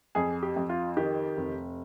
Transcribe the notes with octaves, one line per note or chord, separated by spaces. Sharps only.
F2 G#4
G4
F2
F4
D#3 G4
F1